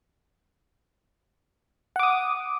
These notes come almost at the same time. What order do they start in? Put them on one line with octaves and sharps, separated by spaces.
F#5 D6 D#6